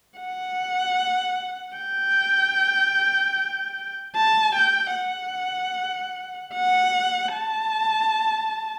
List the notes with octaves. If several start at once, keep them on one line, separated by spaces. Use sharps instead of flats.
F#5
G5
A5
G5
F#5
F#5
A5